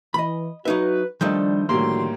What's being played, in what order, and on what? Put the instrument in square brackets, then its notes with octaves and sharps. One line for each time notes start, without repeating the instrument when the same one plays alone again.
[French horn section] E3 [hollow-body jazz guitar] D#5 B5
[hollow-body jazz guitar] F#3 D#4 E5 [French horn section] F#4 [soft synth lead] B4
[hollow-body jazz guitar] D#3 F3 A3 [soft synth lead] G3 [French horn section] D4 [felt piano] D#5 G6
[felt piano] A2 G3 A#3 [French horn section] D3 D4 F#4 [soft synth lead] C6